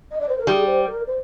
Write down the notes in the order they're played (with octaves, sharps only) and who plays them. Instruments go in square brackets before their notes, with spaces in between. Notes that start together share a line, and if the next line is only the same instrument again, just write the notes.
[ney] D#5
D5
C5
A#4
[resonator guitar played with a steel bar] G3 [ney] G#4
[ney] C5
A#4
C5